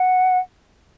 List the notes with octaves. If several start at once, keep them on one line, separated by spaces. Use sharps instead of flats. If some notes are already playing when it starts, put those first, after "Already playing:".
Already playing: F#5